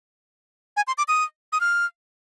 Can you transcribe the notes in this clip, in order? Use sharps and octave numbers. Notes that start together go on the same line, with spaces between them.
G#5
C6
D6
D#6
D#6
F6